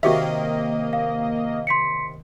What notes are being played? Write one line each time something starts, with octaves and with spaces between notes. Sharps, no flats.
D#2 C3 D#3 A#3 F#4 G4 D#5 E5
F5
C6 B6 C#7